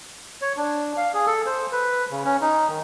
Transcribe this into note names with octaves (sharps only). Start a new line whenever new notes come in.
C#5
D4
F5
G#4
A4
C5
B4
C#3
C#4
D#4
D#3